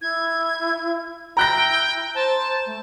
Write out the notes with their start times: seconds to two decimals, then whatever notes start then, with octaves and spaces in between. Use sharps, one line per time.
0.02 E4 G#6
1.37 E4 G5 A#5 F#6 A#6
2.15 C5 A5
2.66 A3